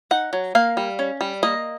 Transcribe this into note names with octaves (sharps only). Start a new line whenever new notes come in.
D#4 F#5
F#3
A#3 F5
G3
C#4
G3
A#3 D#5